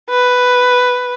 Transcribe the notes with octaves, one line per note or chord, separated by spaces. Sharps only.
B4